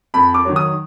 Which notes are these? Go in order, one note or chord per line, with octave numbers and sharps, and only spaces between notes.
F2 B5
D6
D#3 F#3
D#6